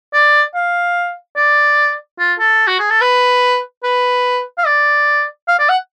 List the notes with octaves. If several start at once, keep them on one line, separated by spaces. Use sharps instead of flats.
D5
F5
D5
F4
A4
F#4
G#4
A4
B4
B4
F5
D5
F5
D5
F#5